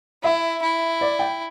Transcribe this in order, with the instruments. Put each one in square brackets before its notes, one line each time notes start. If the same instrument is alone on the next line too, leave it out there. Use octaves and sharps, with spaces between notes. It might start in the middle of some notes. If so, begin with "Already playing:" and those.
[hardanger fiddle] E4 [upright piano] E5
[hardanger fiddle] E4
[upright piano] D5
G5